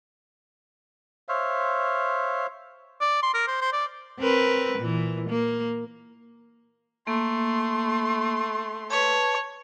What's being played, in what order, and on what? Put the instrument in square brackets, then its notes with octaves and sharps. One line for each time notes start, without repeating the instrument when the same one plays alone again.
[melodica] C5 C#5 E5 F5
[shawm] D5
C6
A#4
C5
C5
D5
[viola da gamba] C4 A#4 B4
A#2 E3
A#3
[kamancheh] A3 C6 [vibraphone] A#3
[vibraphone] B4 A5 [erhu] C#5